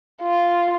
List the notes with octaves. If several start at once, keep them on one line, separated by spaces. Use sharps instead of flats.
F4